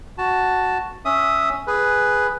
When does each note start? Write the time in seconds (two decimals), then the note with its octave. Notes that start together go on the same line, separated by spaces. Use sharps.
0.18 F#4 A5
1.05 C#4 E5 D#6
1.67 G#4 B4